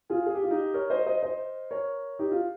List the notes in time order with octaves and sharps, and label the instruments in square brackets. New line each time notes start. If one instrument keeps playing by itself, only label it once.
[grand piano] F4 G#4
G#4
G4
F4
D#4 G4
A#4 C#5
C5 D#5
C5 D#5
C5 D#5
A#4 C#5
D#4 G4
F4